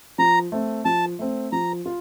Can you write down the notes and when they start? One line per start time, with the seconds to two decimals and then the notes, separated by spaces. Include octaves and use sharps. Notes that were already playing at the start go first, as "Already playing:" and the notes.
0.18 F3 A#5
0.52 A3 C4
0.85 F3 A5
1.19 A3 C4
1.52 F3 A#5
1.86 F4